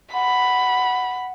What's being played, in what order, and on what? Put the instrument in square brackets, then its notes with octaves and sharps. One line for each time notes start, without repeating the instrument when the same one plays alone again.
[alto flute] F#5 [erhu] B5